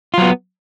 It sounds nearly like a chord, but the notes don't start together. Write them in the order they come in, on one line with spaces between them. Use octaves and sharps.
F4 F#3 B3